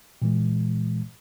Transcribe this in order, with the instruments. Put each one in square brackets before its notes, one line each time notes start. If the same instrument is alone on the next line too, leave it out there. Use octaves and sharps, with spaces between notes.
[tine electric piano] A#2 E3 G#3